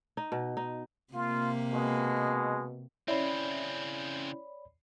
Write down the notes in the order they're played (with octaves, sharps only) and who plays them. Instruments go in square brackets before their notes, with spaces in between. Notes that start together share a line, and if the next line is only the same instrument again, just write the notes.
[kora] D#4
B2
D#4
[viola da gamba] C3 A#3 [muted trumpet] F4
[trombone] B2 [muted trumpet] G#3
[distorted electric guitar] C#3 C4 [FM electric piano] C#4 E4 [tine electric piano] C#5 D5 B5